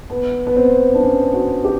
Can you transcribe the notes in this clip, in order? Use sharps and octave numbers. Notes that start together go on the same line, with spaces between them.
B3
B3
C4
D4
C#4
F#4
G4